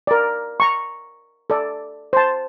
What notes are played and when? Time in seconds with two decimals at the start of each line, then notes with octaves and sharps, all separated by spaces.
0.07 A#4 D5
0.60 A#5 C#6
1.50 A4 D5
2.13 C5 A5